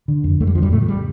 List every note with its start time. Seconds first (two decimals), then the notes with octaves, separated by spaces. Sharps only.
0.08 D3
0.24 F2
0.40 F2 A3
0.47 G3
0.55 D3 F3
0.63 G2 G3
0.72 A2 C#3 A3
0.82 F3
0.88 G3